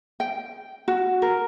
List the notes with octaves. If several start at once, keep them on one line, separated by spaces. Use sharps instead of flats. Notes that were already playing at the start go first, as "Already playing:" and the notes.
G5
F#4
A#4